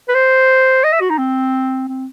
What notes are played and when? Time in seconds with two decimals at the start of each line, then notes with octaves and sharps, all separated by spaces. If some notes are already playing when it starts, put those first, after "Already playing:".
0.08 B4
0.15 C5
0.84 D#5
0.93 E5
1.01 F#4
1.10 D#4
1.18 C4
1.88 C4